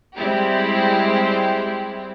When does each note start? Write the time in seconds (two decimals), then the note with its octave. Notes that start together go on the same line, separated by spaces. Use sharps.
0.15 G3 G#3 C4 E4 G4